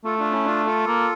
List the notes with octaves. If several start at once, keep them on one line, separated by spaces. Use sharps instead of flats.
A3 F4 A4
D4 F4
C#4 E4
D4 F4
F4 A4
A#3